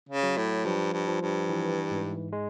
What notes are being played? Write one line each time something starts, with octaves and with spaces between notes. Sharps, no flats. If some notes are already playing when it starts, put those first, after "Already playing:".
C#3
F#3
A2
G2 F3
G2
F3
G2
E3
G#2
G#3